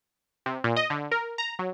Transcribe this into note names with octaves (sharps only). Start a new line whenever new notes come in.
C3
A#2
D#5
D3
A#4
A#5
F#3